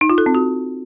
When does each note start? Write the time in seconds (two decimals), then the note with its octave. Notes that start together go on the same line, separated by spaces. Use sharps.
0.01 D#4
0.10 F4
0.18 A4
0.26 C4
0.35 F#4